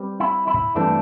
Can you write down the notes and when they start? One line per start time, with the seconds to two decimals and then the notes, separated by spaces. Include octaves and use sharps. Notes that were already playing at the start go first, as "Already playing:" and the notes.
Already playing: G3 C4 G4 B4
0.20 E4
0.48 E4
0.75 G2 E3 A3 C4 D4